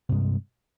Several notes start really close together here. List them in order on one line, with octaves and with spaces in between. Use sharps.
C3 G2 G#3